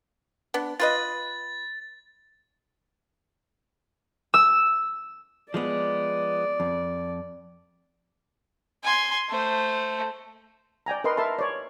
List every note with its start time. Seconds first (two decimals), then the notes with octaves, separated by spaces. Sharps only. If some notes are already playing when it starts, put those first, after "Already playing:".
0.54 B3 D4
0.80 F4 B4 D#5 A6
4.34 E6
5.54 F3 G#3 B3 D5
6.60 F2
8.83 G#5 C6
9.29 A3 C5
10.86 D5 G5 G#5 A#5
11.04 A#4 B4 D#5 C6
11.17 A#4 E5 A5 C6
11.39 C#5 D5